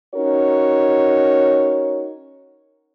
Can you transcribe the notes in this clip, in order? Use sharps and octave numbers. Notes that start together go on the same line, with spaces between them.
C#4 D#4 F#4 A#4 C#5